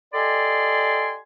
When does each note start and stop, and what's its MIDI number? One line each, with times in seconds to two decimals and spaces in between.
0.13 1.17 67
0.13 1.17 69
0.13 1.17 74
0.13 1.17 75
0.13 1.17 80
0.13 1.17 84